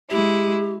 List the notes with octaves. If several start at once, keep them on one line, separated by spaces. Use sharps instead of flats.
G#3 E4 G4